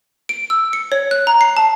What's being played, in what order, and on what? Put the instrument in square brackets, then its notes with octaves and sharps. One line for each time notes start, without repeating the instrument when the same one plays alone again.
[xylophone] D7
E6
C#7
C#5
F#6
A#5
C7
A5